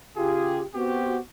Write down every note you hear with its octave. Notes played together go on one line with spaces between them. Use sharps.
C#3 F4 G4 G#4
B3 C4 F#4 G4